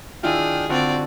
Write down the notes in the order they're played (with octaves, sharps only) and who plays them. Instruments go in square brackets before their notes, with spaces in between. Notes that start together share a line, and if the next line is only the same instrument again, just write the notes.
[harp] D#3 E4 F4 [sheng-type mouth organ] D4 G5 F6 [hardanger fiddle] G#4
[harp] D3 F4 [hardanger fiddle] C4 D5 [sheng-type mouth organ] F#4